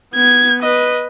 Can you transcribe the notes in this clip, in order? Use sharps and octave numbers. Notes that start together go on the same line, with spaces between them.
B3 G#6
B4 D#5